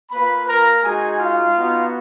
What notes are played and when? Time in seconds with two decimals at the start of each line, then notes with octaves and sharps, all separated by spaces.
0.10 A#3 F4 B4 B5
0.46 A#4 A#5
0.82 G#3 D#4 F#4 G#4 G#5
1.18 F4 F5
1.55 B3 D#4 F#4